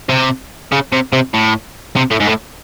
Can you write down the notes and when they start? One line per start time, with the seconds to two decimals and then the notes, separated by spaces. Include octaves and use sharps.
0.09 C3
0.72 C#3
0.93 C3
1.13 C3
1.34 A2
1.96 C3
2.11 A2
2.20 G#2
2.27 A2